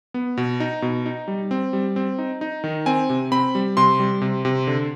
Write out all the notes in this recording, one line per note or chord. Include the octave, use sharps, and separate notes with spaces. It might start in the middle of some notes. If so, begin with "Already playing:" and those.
B3
B2
D#4
B2
D#4
G3
C4
G3
C4
D#4
D#4
D#3
C4 G#5
C3
C4 B5
G3
C3 C6
G3
C3
C3
D3